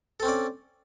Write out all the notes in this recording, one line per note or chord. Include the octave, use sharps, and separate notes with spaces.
C4 C#4 A4 D5